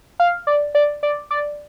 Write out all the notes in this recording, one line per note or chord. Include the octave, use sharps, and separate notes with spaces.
F5
D5
D5
D5
D5